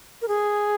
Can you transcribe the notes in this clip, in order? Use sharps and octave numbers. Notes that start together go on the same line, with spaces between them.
A#4
G#4